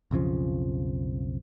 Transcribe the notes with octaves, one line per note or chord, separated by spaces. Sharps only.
B1 F2 C#3 F3